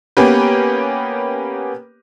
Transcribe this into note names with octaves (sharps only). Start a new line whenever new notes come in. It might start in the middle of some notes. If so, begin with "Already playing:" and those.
A#3 B3 C#4 G4 B4